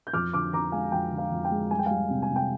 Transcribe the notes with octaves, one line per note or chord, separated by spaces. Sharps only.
G6
F2 D6 F6
D3 D6 F6
F2 A#5 D6
G#3 F5 G#5
F2 G5
D3
F5
F2
G5
G#3
G3 G#5
G5
G3 F5 G#5
C3
G#5
C3
G5